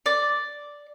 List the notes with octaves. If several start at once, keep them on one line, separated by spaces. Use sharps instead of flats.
D5